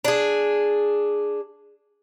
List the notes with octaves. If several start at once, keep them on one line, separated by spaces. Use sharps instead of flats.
D4 G#4